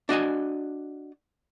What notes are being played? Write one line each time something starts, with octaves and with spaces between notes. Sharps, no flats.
D4 F#4 D#5 G#5